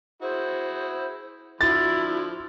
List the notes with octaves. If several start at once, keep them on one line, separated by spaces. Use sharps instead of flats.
E4 F#4 G#4 C5
D3 F3 E4 F#4 C6 A6